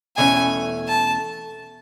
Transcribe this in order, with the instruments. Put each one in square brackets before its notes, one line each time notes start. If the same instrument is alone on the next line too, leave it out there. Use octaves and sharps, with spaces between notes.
[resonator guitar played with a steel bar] E2 B2 A3 C#4 [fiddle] G#5
[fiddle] A5